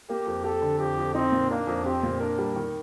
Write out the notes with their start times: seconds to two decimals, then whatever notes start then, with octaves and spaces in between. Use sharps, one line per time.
0.10 A#3 G4
0.26 F2
0.44 G4 A4
0.62 D3
0.79 F2 G4
0.98 F2
1.15 C4 D#4
1.32 A#2
1.50 A#3 D4
1.67 F2
1.85 C4 G4
2.03 A#2
2.20 D4 A#4
2.38 G3
2.56 D#3